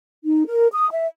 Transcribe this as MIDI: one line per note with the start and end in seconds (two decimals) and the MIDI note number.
0.24 0.43 63
0.46 0.68 70
0.72 0.89 87
0.91 1.06 76